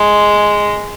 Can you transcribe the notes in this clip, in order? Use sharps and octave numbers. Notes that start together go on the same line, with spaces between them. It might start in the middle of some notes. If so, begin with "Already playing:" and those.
Already playing: G#3